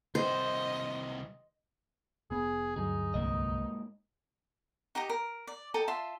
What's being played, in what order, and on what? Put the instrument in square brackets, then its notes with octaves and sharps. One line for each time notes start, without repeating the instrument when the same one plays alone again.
[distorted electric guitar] C2 D#3 [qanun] C5 [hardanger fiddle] D#5
[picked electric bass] F1 B3 [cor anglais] G#4
[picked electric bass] D2 G2 F#3 [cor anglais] D#4 [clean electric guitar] G#4
[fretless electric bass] C2 [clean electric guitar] G#2 A#3 D#5
[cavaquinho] D#4 G4 D#5 A#5
A#4
D5
A4 D#5 G5 A#5
F4 E5 A5 C6